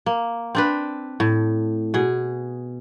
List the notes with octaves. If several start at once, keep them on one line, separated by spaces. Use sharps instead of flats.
A#3
C4 D4 B4
A2
B2 G#4